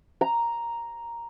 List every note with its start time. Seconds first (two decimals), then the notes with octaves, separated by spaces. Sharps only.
0.21 A#5